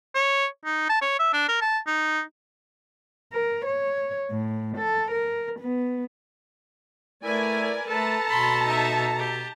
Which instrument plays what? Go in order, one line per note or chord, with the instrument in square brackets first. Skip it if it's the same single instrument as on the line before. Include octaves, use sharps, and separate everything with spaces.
[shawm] C#5
D#4
A5
C#5
E5
D4
A#4
A5
D#4
[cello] A#4
C#5
A2
A4
A#4
B3
[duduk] A3 [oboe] E4 [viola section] A#4 D5 G#5 [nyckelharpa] B4
[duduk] A3 [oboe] A4 [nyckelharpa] B4 [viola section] A5 A#5
[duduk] B2 [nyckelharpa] B5 C6
[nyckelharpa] D#4 E5
G4